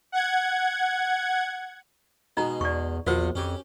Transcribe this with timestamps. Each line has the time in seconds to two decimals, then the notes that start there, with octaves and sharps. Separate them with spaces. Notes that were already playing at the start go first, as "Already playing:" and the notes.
0.12 F#5 G#6
2.37 B2 G#3 D#4 A#5
2.61 E2 D5 C#6
3.07 A#1 E2 F4 F#4 A#4 C5 F#5
3.35 F2 C#4 G4